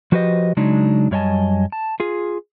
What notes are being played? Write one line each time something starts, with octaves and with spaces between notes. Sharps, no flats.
F3 F#4 G4 B4 C5 D#5
C#3 F#3 G#3 D4 D#4
F#2 G3 C#5 D#5 G#5 A5
A5
F4 G#4